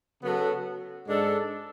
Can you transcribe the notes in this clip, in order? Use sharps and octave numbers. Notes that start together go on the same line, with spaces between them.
C#3 F#3 B3 F#4 A4
G#2 G#3 D4 A4